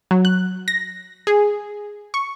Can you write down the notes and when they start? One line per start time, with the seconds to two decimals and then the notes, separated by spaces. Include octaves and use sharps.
0.11 F#3
0.25 F#6
0.68 A#6
1.27 G#4
2.14 C#6